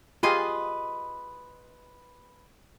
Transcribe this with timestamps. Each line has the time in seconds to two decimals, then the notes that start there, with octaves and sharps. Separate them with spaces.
0.23 F4 G4 G#4 B4 D#5 C6